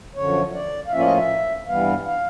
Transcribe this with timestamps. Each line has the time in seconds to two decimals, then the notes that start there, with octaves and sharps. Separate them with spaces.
0.16 F#2 D3 F3 C#5
0.54 D5
0.87 F5
0.92 A2 F3 A#3 C#4 F4 E5
1.00 D5
1.04 D#5
1.17 E5
1.68 G2 E3 G3 B3 F5
2.05 F5